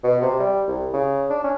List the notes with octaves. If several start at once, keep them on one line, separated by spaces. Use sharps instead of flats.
B2
C3
G3
C2
C#3
D4
C#4